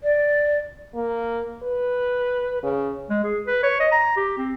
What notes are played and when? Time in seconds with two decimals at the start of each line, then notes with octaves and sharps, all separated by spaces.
0.03 D5
0.94 A#3
1.63 B4
2.63 C#3
3.10 G#3
3.24 G#4
3.47 B4
3.63 C#5
3.80 D#5
3.91 A#5
4.17 G4
4.38 C4